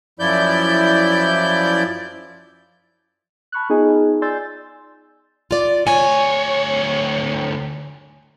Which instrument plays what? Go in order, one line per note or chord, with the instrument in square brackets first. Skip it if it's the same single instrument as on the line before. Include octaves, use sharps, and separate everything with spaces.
[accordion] F#2 F3 E4 D5 G6
[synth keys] A5 B5 C#6 F6 F#6
B3 D#4 F4 G#4 D#5 G#5
D5 G#5 C6 E6 G6 A6
[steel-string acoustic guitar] F4 D5
[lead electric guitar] D2 C#5 [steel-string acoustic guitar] G#5